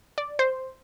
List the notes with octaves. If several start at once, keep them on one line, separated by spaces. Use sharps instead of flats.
D5
C5